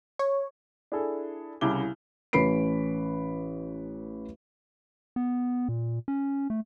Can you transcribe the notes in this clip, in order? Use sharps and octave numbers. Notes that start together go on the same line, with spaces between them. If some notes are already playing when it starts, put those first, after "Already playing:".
C#5
D4 E4 G#4 A4
C2 C#3 E4 D6 G7
A1 C#4 B4 B5 C7 D7
B3
A#2
C#4
A3